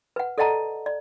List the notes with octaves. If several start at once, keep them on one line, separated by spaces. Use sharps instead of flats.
B4 F#5
A4 D5 D#5 F#5 A5 A#5
D5